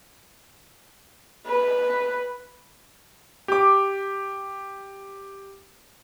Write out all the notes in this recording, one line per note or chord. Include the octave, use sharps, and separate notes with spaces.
B4
G4 D6